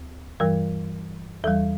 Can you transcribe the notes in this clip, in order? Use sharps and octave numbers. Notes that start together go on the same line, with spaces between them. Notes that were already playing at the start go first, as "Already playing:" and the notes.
Already playing: D2
G2 E3 G3 A#4
E2 E3 G3 A4